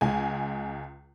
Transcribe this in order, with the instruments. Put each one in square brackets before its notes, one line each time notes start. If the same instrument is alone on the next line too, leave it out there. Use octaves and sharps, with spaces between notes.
[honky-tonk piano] C#2 G#3 G#5